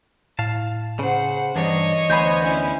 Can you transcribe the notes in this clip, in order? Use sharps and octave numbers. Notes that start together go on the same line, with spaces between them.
A2 F5 A5
C#3 C5 F#5
G2 E3 D4 D#4 C#5 D#5
D2 B3 C5 G#5 B5
C#4 E4